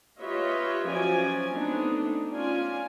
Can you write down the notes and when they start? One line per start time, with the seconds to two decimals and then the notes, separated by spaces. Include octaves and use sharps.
0.20 F4 G4 B4 C#5 D#5 E5
0.86 F3 F#3 C#4 D5 G#5
1.53 A3 B3 C4 D4 D#4
2.31 C#4 F4 D5 G#5